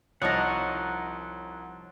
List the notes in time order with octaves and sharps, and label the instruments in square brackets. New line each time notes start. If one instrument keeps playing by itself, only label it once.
[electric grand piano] C2 [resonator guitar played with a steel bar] F3 D#4 [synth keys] C#5 A5 A#5 [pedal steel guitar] F#5 C#6